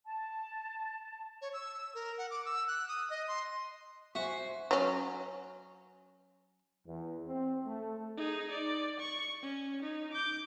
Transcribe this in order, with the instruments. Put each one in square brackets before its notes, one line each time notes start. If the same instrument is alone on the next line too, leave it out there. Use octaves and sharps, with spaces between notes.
[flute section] A5
[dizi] C#5
E6
A#4
F#5
D6
E6
F#6
D#6
D#5
C6
[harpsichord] F#4 [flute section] C5 G#5 C#6 [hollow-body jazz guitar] E5
[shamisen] F#3 C#4
[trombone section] E2
C4
A3
[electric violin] D#4 G#4
D5
C#6
C#4
D#4
D6 G6